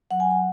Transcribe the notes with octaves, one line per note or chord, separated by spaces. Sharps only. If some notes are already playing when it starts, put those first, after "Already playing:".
F#3 F#5
G#5
F#5